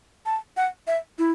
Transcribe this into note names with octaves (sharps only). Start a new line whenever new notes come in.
A5
F#5
E5
E4